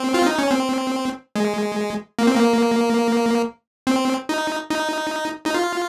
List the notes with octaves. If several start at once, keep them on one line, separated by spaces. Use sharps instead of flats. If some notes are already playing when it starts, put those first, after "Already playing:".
Already playing: C4
F4
D#4
C#4
C4
G#3
A#3
C4
A#3
C4
D#4
D#4
D#4
F4